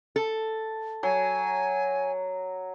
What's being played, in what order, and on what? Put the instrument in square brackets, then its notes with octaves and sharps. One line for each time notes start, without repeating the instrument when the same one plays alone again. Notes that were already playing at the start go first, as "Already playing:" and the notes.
[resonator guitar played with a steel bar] A4
[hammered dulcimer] F#3 [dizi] G#5